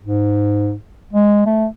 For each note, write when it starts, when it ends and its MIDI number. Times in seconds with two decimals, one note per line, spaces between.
0.05 0.74 44
1.13 1.44 56
1.46 1.66 57